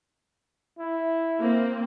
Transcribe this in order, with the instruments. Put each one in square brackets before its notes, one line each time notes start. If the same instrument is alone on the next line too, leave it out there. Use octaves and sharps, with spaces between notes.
[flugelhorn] E4
[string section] A#3 C4